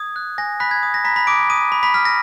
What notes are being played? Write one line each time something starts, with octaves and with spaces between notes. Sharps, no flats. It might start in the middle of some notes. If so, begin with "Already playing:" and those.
Already playing: D#6 G#6
F#6
G#5 A#6
B5 F#6 B6
G#6
D#6
A#6
A#5 B5 B6
B5 B6
D6 D#6 D7
D#6 D#7
B5
B5 B6
B5 F6 B6
A#6